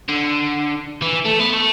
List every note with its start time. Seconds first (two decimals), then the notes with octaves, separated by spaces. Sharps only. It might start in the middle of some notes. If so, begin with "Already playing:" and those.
0.09 D3
1.02 E3
1.25 A3
1.39 B3
1.53 A3